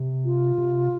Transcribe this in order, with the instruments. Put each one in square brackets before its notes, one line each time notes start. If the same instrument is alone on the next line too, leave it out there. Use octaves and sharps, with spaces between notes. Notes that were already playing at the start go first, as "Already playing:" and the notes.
Already playing: [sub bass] C3
[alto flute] F4
[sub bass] C3